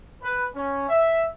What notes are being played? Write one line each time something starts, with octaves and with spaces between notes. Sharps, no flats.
B4
C#4
E5